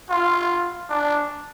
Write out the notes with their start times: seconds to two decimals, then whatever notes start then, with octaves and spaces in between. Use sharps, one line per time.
0.10 F4
0.90 D4